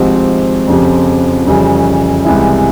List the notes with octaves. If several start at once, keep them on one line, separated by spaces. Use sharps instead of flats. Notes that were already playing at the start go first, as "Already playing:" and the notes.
Already playing: G#1 G#2 F3 C4 G4
F2 C#3 F3 C4 G4
F2 C#3 E3 G3 C#4
C2 C3 E3 G#3 E4